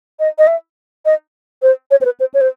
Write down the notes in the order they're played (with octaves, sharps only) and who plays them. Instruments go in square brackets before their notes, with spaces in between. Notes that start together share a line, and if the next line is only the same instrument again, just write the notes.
[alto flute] D#5
D#5
E5
D#5
C5
C#5
C5
B4
C5
C#5
C5